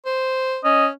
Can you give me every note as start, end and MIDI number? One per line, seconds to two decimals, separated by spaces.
0.06 0.59 72
0.64 0.90 61
0.64 0.86 75